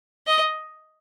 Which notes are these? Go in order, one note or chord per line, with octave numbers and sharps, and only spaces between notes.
D#5